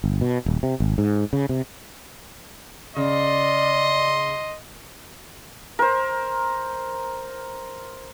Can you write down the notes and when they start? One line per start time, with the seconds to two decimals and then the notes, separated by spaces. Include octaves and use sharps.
0.04 G1
0.21 B2
0.46 D#1
0.63 C3
0.80 G#1
0.98 G#2
1.33 C#3
1.49 C3
2.96 C#3 D5 D#5 C6
5.79 A#4 C5